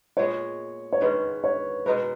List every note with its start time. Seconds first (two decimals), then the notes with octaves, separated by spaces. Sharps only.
0.17 A#2 G#3 B3 C#5
0.93 C#5
1.01 G#2 D#3 G#3 C#4 B4
1.44 C#5
1.86 B2 G#3 D#4 A#4 B4